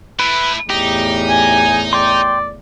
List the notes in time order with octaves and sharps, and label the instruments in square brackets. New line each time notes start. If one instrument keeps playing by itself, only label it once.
[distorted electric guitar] A3 E4 [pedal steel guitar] B4
[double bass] E2 A2 [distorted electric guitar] D#4 [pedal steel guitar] G4
[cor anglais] G#5
[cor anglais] D5 [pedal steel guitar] G5 C6